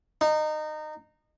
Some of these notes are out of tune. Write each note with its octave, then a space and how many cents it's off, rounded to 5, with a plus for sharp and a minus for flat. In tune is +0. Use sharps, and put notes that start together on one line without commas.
D#4 -20